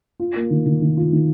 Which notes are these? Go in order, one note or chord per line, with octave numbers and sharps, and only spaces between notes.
F4
A#3
D#3
D#3
D#3
F4
D#3